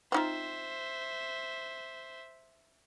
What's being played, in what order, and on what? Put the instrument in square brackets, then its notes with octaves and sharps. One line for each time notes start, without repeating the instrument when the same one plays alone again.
[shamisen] C4 D#4 F4 [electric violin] C5 E5